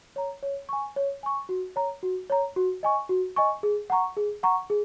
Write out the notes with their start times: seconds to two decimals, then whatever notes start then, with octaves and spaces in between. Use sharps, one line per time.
0.16 C#5 A#5
0.43 C#5
0.69 G#5 C#6
0.96 C#5
1.23 G#5 C#6
1.49 F#4
1.76 C#5 A#5
2.03 F#4
2.30 C#5 A#5
2.56 F#4
2.83 D#5 G#5 C#6
3.09 F#4
3.36 D#5 G#5 C#6
3.63 G#4
3.90 F#5 A#5 C#6
4.17 G#4
4.43 F#5 A#5 C#6
4.70 G#4